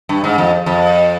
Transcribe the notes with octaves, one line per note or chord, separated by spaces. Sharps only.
G2
G#2
F2
F2